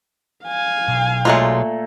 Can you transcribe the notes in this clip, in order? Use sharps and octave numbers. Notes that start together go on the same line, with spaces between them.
F5 G#5
B1
A#2 F#3 G#3 A3 F4